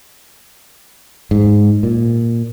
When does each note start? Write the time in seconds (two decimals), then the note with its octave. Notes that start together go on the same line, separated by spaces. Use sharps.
1.31 G#2
1.83 A#2